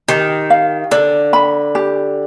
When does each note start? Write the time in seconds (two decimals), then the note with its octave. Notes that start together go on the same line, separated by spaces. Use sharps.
0.08 D#3 G4
0.50 F5
0.91 D3 D5
1.33 B5
1.75 G4